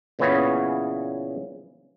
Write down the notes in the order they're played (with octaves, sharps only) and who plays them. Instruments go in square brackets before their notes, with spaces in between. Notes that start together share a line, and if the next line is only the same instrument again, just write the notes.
[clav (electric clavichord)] A#2 C#3 E3 B3 C#4 G#4